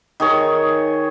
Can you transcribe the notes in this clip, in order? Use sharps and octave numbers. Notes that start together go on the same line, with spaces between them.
D#3 G#4 C#5